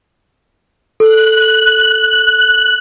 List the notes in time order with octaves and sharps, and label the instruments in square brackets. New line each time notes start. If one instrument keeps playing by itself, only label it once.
[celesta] A4 [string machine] F#6